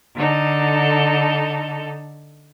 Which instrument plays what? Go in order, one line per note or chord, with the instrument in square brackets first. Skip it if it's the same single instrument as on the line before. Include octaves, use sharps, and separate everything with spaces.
[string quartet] D3 D#4 A4